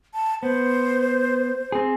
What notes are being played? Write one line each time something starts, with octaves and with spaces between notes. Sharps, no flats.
A5
B3 C5
C4 G#4